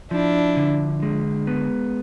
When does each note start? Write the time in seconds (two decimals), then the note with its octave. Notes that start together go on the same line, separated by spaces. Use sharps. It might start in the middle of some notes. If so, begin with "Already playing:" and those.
0.11 F3 D4 E4
0.57 D3
1.02 G#3
1.47 B3